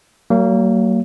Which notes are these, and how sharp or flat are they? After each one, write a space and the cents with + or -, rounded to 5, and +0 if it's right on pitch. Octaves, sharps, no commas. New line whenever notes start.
F#3 +35 A#3 -25